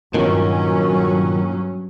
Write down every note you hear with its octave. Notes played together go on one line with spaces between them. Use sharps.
G2 A#2 D#3 F#3 C#4